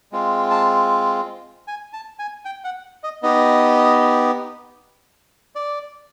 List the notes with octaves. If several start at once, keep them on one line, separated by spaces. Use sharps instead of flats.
G#3 C4 F4
A5
G#5
A5
G#5
G5
F#5
D#5
B3 D#4 G4 D#5
D5